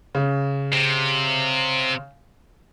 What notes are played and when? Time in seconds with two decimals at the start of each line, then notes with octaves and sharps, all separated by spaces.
0.15 C#3
0.73 C3